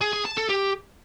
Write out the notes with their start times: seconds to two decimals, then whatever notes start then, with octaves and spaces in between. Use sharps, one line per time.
0.01 G#4
0.13 G#4
0.25 A5
0.37 A4
0.49 G4